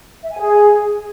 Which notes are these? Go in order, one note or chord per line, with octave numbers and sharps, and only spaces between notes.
E5
G#5
G#4